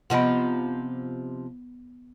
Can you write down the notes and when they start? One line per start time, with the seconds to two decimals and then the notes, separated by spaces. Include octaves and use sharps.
0.10 C3 F3 B3 D#4 F#5